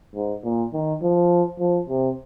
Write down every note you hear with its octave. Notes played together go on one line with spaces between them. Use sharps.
G#2
A#2
D#3
F3
F3
C3